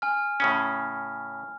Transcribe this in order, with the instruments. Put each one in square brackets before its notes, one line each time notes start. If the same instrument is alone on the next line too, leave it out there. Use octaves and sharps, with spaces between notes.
[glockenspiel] G#5 F6
[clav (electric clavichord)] A2 C#3 C#4